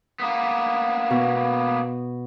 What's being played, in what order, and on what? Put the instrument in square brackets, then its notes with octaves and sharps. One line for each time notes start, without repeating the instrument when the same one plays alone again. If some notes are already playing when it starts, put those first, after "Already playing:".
[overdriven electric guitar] A#3 B3
[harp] B2